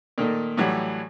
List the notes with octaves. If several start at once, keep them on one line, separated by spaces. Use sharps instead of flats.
A#2 D#3 A3 A#3
A2 E3 F#3 G3